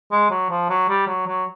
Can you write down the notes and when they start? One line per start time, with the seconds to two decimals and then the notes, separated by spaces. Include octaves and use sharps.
0.12 G#3
0.31 F#3
0.50 F3
0.70 F#3
0.89 G3
1.07 F#3
1.27 F#3